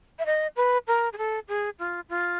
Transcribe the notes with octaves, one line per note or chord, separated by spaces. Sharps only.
E5
D#5
B4
A#4
G#4
A4
G#4
F4
F4